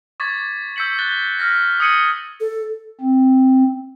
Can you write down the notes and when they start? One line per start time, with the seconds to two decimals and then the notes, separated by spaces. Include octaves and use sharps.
0.20 C#6 D6 G#6 A6 B6
0.76 E6 G6 B6 C#7 F#7
0.99 F#6 A6 G7
1.39 F6 A#6 B6
1.80 D#6 G#6 C#7 D#7 F#7 G7
2.40 A4
3.01 C4